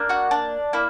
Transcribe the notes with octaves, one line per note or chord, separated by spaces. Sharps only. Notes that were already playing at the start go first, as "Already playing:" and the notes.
Already playing: A#3 D4
F#4 F#5
D4 D5
A#3 E4